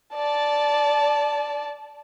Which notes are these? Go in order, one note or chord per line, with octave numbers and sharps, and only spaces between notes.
D5 A5